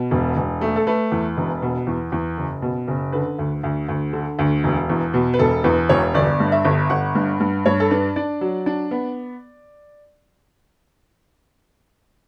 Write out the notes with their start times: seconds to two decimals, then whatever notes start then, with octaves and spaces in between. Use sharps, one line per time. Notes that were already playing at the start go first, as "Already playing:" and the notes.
Already playing: B2
0.11 E1
0.36 E1
0.61 A3
0.76 A4
0.87 A3 B4
1.12 E2
1.37 E1
1.62 B2
1.87 E2
2.12 E2
2.38 F#1
2.62 B2
2.88 F#1
3.12 D3 B4
3.39 D2
3.63 D2
3.88 D2
4.13 D3
4.39 D2
4.64 E1
4.90 E2
5.14 B2
5.34 B4
5.39 E1 A4
5.64 E2 B4
5.89 E1 C#5
6.14 G1 D5
6.40 G2
6.52 E5
6.65 G1
6.90 G1 F#5
7.15 G2
7.40 G2
7.66 G2 C#5
7.80 A4
7.91 D4 B4
8.16 D4 D5
8.41 F#3
8.66 D4
8.91 B3